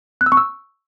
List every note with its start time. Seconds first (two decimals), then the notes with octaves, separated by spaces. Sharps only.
0.21 F#6
0.26 E6
0.32 C#6
0.37 E6